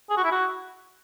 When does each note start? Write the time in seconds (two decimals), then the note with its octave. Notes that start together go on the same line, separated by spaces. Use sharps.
0.10 G#4
0.17 F#4
0.24 E4
0.31 F#4